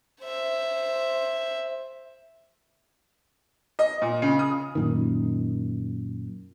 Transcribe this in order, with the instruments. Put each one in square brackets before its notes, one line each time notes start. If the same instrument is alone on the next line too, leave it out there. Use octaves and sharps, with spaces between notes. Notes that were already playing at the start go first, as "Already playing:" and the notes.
[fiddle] C5 E5
[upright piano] D#5
A#2
C#3
D#6
[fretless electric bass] F#2 A#2 D#3